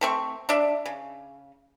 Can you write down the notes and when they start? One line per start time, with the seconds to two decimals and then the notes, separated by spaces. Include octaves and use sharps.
0.01 A3 C4 C#6
0.49 D4 D5 E5
0.86 C#3